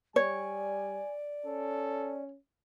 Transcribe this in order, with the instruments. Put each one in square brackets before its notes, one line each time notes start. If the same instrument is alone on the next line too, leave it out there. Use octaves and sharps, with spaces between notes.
[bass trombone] G3 [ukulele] C#5 [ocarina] D5 [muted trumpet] G#5
[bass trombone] C#4 [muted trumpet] A4